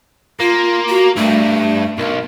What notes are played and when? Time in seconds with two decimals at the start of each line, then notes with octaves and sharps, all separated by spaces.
0.40 A#3 F4
0.89 F#4
1.16 G2 A3
1.98 B1 A#4